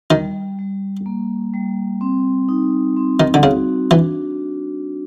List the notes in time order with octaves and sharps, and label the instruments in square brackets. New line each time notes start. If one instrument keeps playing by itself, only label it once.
[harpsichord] D#3 [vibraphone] G3
[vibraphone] G3
A#3
G3
C4
D#4
C4
[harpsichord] D#3
D3
[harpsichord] C#3 [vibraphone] F#4
[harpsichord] E3 [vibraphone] D4